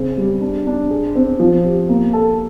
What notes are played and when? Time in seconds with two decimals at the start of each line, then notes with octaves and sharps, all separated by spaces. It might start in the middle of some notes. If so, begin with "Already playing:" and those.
Already playing: C#3 C4
0.18 G3
0.41 D4
0.67 D4
0.90 G#4
1.15 C4
1.40 F3
1.65 G4
1.89 A#3
2.13 A4